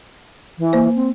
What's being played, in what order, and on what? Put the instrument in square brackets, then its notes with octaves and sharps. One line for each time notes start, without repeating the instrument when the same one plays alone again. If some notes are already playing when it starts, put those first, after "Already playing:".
[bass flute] E3
[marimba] A#3 C5
[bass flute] C4